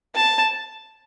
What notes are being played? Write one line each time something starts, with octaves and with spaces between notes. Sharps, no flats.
A5